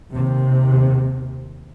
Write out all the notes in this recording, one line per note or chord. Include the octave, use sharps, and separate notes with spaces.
D#2 C3